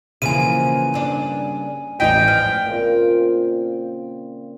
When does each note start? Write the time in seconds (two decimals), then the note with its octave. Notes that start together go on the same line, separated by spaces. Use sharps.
0.22 C#3 E3 F3 A#3 E4 G#5 D#7
0.94 G2 D4
2.00 A1 G3 D#4 D#5 G5 B6
2.28 G#2 F3 F6
2.65 A#2 C#3 C4